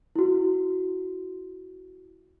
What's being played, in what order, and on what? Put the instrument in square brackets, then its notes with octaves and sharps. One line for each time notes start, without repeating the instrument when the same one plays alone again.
[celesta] E4 F#4